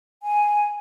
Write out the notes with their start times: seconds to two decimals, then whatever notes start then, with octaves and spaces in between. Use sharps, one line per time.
0.23 G#5